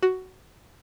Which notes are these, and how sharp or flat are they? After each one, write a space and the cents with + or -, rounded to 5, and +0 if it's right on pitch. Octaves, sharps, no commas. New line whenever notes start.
F#4 +10